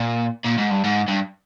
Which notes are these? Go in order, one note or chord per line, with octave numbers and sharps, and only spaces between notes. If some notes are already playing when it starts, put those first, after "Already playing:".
Already playing: A#2
A#2
G#2
G2
G#2
G2